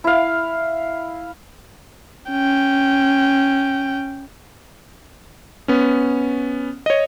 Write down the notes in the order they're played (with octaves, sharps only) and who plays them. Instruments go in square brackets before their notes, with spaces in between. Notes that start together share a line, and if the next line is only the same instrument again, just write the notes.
[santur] E4 F5
[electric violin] C#4 G5
[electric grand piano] B3 C#4
C#5 D#5